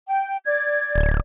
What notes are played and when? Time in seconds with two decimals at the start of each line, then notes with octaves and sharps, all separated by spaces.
0.08 G5
0.45 D5 G#6
0.96 D1